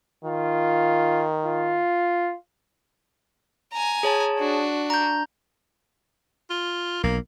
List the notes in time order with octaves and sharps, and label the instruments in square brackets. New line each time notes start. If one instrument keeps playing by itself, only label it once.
[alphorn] D#3 [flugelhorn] F4
[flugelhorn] F4
[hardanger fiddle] G#5 A#5
[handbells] G#4 C#5 A5
[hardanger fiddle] D4 F#4
[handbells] A#5 G6
[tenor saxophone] F4
[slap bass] B1 [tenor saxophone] A#3